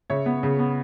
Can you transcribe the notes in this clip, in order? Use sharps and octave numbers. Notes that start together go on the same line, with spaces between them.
C#3 C#5 E5
B3
C#3
B3